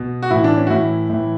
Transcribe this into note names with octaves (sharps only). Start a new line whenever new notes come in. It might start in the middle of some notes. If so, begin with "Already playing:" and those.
Already playing: B2
F#4
A2 E3 E4
D4
C#4
F#4
A2 E3 E4
A2 E3